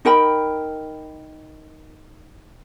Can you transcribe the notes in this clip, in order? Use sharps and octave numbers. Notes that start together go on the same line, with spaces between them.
D#4 A#4 G5 B5